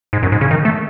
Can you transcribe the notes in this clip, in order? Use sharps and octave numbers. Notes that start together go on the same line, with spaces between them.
G#2
F#2
G#2
C#3
D#3
A3